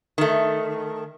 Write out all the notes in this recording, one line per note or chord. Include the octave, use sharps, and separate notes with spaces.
D#3 A3